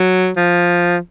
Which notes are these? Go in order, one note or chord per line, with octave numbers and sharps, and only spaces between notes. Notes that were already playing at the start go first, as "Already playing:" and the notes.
Already playing: F#3
F3